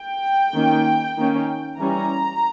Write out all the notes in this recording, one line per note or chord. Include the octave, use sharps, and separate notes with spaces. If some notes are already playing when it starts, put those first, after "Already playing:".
Already playing: G5
D#3 A#3 C#4
D#3 A#3 C#4
E3 G3 C#4 A#5